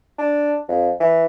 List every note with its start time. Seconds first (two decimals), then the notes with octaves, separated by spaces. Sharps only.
0.18 D4
0.68 F2
1.00 E3